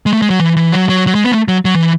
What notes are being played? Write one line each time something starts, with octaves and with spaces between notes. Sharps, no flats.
G#3
A3
G#3
F#3
E3
E3
F#3
F#3
F#3
G#3
B3
A3
F#3
F#3
E3